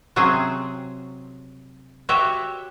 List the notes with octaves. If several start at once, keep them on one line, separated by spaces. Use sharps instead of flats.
C3 F#3 C#4 G#4 C5
F#4 G4 C#5 E5